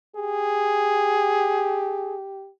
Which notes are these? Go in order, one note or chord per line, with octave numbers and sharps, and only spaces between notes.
G4 G#4